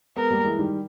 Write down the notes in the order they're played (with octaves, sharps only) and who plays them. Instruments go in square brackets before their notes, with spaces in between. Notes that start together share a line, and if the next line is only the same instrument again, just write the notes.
[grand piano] G#3 B3 [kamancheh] A#4
[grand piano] G3 A#3
E3 G#3
D#3 G3